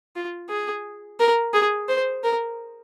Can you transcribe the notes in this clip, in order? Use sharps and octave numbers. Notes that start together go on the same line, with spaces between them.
F4
G#4
A#4
G#4
C5
A#4